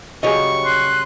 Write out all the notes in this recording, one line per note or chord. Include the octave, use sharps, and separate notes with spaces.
C#3 F#3 G3 G#4 C#5 D#5 C#6
C6 F#6